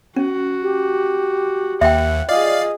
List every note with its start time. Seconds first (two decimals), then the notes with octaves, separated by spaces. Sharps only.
0.16 C#4 F#4
0.63 G4
1.81 D#2 E5 F#5 G5
2.29 F4 G#4 D5 D#5 F5